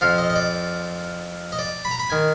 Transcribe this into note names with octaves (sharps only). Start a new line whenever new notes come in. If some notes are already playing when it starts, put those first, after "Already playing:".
F2 F3 F5
D#5
D#5
D5
D#5
D5
B5
A#5
B5
D#3 G#5